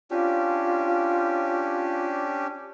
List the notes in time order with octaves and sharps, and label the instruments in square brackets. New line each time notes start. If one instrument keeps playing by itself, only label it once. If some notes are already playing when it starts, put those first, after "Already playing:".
[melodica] C#4 D4 G4 [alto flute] F4